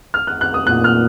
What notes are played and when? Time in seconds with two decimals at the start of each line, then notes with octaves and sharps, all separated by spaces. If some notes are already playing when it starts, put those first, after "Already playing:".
0.14 F6
0.27 F#6
0.41 F#6
0.54 D#6
0.66 A#2 F#6
0.84 F6